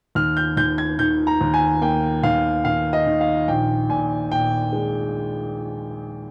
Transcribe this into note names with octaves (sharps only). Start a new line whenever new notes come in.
D#2 F6
G6
D#2 G6
G#6
D#3 G6
A#5
D#2
G#5
A#3 G5
D#2 F5
D#3 F5
D#5
D#3
F5
A#1 G5
A#2 G#5
A#2 G5
G#3